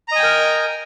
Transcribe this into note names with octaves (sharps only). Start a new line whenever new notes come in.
A#4 D#5 G5 G#5 A#5